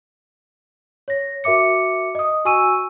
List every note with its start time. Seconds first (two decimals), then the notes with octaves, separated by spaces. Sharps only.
1.08 C#5 A#6
1.44 F#4 A#4 E5 D6 C#7
2.15 D#5 D#6
2.45 F#4 G#5 C#6 E6 D#7